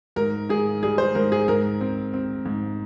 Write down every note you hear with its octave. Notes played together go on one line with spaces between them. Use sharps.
G#2 A#4
G#2 G#4
G3 G#4
C5
G#2 A#4
G#4
G#2 A#4
C4
C4
G#2